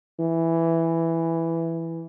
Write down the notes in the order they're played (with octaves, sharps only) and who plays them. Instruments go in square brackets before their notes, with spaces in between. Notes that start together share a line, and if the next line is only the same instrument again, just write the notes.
[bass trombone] E3